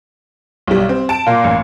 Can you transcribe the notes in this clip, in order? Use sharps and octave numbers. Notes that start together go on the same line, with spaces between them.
B1 G3
C4
A5 D7
A#2 A#3
A1